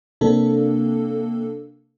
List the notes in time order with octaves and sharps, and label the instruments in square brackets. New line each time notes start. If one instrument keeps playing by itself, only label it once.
[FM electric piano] C3 A#3 C4 D4 A4